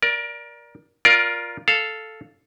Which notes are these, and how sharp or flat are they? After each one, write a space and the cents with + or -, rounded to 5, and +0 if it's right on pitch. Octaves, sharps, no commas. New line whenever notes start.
A#4 +25 D5 +0
F4 +0 A#4 +20 D5 +0
A4 +0 F5 +0